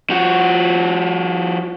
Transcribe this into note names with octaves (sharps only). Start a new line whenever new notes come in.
F3 F#4